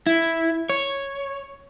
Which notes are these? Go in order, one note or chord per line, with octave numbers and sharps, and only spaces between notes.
E4
C#5